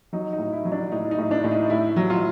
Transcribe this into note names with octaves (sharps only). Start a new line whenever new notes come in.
F#3 D#4
D#4
A2
E4
F#3
D4
A2 D#4
D#4
A2
D4
A2
D#4
A2 E4
F#3
F4